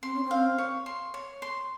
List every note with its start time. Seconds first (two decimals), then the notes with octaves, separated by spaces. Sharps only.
0.02 C4 C6
0.14 C#4
0.25 C4
0.31 F5
0.58 C#5
0.86 C6
1.14 C#5
1.42 C6